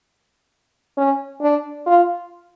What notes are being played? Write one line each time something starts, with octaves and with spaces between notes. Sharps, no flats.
C#4
D4
F4